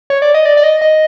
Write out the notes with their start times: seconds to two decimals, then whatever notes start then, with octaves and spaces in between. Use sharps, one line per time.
0.10 C#5
0.22 D5
0.34 D#5
0.45 D5
0.57 D5
0.64 D#5
0.81 D#5